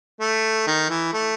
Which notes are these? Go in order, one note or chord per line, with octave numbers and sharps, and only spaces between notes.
A3
D#3
E3
A3